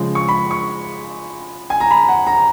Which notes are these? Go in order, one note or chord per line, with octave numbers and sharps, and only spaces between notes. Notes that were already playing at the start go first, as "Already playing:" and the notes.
Already playing: C#3 F3 G#3
C#6
B5
C#6
G#5
A#5
B5
F#5
A#5